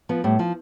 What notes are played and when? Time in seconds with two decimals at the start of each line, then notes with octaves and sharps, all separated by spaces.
0.09 F3 B3
0.24 A2 G3
0.39 F3